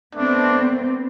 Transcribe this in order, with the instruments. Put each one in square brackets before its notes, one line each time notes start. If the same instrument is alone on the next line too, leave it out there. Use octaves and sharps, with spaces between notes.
[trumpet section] A3 D4 [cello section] B3 C4